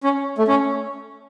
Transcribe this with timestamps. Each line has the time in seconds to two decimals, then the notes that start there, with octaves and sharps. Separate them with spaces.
0.04 C#4
0.38 A3
0.48 C#4